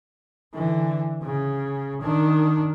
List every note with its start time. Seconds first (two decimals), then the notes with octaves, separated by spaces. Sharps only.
0.54 D3 E3
1.23 C#3
2.01 D#3 D4